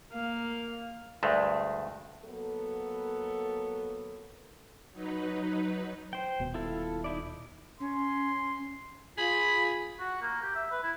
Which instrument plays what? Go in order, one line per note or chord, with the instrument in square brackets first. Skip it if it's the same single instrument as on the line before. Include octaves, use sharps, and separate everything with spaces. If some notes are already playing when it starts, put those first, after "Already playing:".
[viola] A#3 F5
[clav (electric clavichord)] D2 G2 G#3 A3
[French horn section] F#3 A#3 B3 A4
[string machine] F#3 D#4 B4
[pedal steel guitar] C5 G5
[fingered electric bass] D#1 B2
[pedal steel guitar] E4 F4 A4
D#4 E4 D5
[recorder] C#4 [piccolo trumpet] C6
[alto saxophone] F4 [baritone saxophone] G#4 [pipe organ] B5
[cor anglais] F#4
A#3
G4
E5
B4
E4